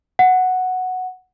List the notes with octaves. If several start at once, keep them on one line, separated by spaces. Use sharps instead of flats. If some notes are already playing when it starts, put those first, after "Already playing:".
F#5